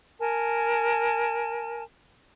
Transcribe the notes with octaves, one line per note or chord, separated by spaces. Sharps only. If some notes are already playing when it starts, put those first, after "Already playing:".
A#4 G#5 A5